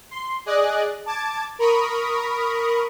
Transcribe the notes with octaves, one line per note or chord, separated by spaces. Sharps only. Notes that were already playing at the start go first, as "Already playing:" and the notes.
C6
G#4 D5 D#5 F#6
A5 D6 G#6 A6
A#4 B5 C#6 D#6